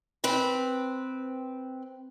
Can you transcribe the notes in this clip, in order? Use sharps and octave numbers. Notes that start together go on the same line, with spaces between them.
C4 B4